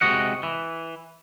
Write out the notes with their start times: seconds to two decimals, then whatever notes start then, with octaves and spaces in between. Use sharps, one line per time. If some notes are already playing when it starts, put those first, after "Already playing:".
0.01 C3 G#3 F#4 D#5 F#5
0.43 E3